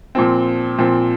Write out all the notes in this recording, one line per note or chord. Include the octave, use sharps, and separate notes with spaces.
A#2 F3 C4
A#2 F3 C4